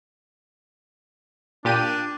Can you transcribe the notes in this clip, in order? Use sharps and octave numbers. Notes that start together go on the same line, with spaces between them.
A#2 D4 G4 D#7